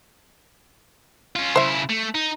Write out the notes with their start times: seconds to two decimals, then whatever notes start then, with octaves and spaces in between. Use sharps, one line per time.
1.36 C#4 F4
1.56 C#3 E4 C5 E5
1.90 A3
2.15 D#4